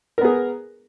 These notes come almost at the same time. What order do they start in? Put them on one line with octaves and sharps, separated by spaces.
A#4 B3 G#4